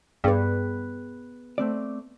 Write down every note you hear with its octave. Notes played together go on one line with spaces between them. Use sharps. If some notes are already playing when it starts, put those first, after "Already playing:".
G2 B3 G#4 B4 G5
A3 C4 D5